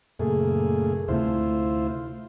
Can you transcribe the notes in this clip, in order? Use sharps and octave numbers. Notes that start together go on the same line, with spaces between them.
F#2 A#2 C#3 A3 G#4
D2 C3 A3 E4 F4 C5